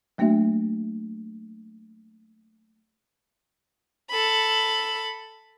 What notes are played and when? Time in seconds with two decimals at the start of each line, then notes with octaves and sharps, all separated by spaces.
0.18 F#3 A3 A#3 D4 F#4 E5
4.10 A4 B5